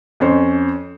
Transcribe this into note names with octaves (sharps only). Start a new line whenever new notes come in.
F2 C#4 C5